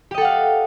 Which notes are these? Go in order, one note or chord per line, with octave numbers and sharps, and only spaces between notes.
G4 A4 D#5 F5 F#5